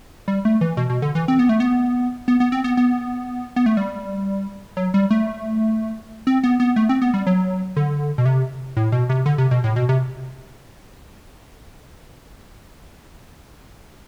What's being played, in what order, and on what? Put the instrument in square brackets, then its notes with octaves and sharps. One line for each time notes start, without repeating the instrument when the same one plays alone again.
[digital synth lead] G3
A3
E3
B2
B2
D3
E3
C4
B3
A3
B3
B3
B3
C4
B3
B3
B3
A3
G3
F#3
G3
A3
C4
B3
B3
A3
C4
B3
G3
F#3
D3
B2
C3
A2
B2
C3
D3
C3
B2
A2
B2
C3